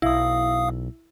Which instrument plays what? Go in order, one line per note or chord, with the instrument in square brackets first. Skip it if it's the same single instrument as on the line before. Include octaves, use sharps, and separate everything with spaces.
[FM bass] B1 [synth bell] E4 [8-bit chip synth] F5 D#6